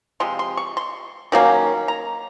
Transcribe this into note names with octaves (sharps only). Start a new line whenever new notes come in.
C3 F3 G#3 C6
C6
C#6
C6
D#3 F#3 A#3 C#4
A#5